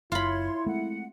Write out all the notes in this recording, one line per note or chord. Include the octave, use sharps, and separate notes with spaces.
F#1 E4 F4 C#5 B5 C6
G#3 A3 C4 F#5